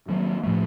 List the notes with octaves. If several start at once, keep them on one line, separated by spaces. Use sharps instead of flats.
D#3 F#3 A#3
A2 F3 A3